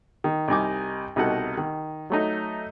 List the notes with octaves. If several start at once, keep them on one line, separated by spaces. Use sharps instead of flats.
D#3
C2 G3 D#4 G#5 D6
C2 B2 D#4 F#4 A4 F#5
D#3
F#3 A3 D#4